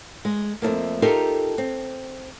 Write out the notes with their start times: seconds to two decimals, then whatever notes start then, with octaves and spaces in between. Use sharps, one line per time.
0.25 G#3
0.62 F2 B2 A3 A#3
1.02 D#4 F4 G4 A4 A#4
1.58 C4